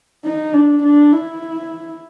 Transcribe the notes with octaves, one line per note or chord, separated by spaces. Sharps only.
D#4
D4
D4
E4